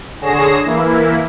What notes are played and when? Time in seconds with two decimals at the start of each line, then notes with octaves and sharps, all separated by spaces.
0.21 D3 G#4 C#5 A#6 C7 E7
0.64 E3 A#3 E4